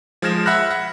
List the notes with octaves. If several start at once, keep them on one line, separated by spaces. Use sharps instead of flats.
F3 G#3 F6 G#6 A#6 E7
E5 F#5 B5 F6 F#6 A#6
F#5